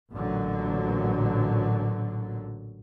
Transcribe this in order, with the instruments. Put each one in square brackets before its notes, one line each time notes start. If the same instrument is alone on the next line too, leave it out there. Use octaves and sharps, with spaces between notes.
[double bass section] A1 A#2 D3 F#3